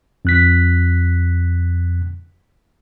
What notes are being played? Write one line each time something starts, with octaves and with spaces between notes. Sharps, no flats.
F2 F#6 B6